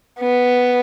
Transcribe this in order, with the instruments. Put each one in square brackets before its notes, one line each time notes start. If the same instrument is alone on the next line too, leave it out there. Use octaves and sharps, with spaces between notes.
[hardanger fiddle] B3